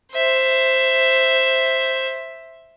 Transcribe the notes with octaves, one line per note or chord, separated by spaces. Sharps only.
C5 E5